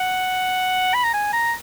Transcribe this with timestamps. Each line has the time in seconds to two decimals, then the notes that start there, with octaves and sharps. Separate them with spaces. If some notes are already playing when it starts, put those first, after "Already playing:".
Already playing: F#5
0.94 B5
1.04 A#5
1.14 G#5
1.33 A#5